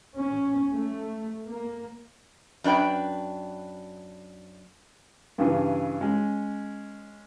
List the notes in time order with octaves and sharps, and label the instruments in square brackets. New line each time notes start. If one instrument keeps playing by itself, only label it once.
[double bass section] C#4
A3
A#3
[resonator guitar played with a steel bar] F#2 D4 B4 G5
[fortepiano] G2 C#3 E3
G#3 C#4